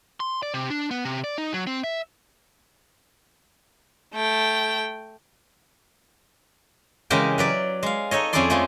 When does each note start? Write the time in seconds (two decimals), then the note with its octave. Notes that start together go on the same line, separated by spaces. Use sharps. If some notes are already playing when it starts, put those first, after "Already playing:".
0.20 C6
0.43 D5
0.54 C3
0.70 D4
0.91 B3
1.05 C3
1.24 D5
1.38 D#4
1.54 F#3
1.67 C4
1.84 E5
4.14 A3 G5
7.10 C#3 E3 G#3 G4 A#4
7.38 F#3 B4 D5
7.83 G#3 F5
8.11 D#4 A4 C#5 D#5
8.33 F2 C#4 E4 G#4 D5 C6
8.50 F3 G#3 A3 G#4